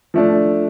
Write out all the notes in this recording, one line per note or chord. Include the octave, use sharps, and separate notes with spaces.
F3 A3 D4